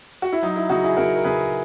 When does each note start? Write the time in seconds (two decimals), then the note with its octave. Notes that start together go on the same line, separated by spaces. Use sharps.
0.22 F#4
0.33 E4
0.42 F#3 D#4
0.56 E4
0.69 C#3 D#4 F#4
0.84 E4 G#4
0.97 C#3 F#4 A#4
1.16 A#4
1.24 C#3 G#4 B4